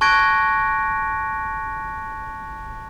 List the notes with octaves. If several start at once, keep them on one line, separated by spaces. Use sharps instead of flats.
A5 C#6 F#6 G#6 A#6 D7